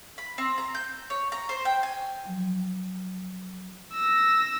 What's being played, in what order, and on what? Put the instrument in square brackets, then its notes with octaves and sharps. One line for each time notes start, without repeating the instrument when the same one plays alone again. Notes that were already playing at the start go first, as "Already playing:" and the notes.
[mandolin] B5
C4
A#5
G6
C#5
A#5
C5
G5
G#5
[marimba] F3 F#3
[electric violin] E6 A#6